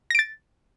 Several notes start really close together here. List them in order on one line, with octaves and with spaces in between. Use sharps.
A#6 D7 A6